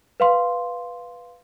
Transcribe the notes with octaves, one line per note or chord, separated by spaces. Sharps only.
B4 F5 C6